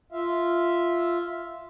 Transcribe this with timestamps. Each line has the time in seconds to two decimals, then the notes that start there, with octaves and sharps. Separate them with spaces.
0.12 F4 E5 F5